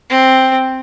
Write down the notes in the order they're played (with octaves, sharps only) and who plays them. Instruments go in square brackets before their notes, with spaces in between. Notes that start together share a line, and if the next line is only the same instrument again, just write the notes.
[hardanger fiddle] C4